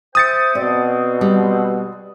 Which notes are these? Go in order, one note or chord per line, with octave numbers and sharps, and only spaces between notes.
C5 E5 G5 D#6 A6 C#7
B2 C4 D5
G3